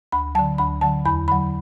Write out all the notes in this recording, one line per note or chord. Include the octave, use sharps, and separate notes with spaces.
D2 B5
D3 F#3 A5
D2 B5
D3 F#3 A5
E2 B5
D3 F#3 B5